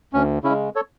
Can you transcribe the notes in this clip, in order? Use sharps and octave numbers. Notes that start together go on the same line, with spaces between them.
D2 C#4
C#3 C#4 E4
G#3
A4 C#5